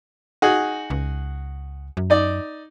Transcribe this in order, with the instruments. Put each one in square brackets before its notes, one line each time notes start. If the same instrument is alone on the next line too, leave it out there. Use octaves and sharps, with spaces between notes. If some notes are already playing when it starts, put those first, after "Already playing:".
[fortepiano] D#4 F#4 G#4
[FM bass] C#2
F#2
[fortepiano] D#4 D5